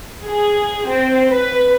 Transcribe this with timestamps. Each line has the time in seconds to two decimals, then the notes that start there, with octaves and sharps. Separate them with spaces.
0.23 G#4
0.88 C4
1.31 B4